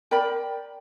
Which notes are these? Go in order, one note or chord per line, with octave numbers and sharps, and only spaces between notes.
A#4 D5 G5 B5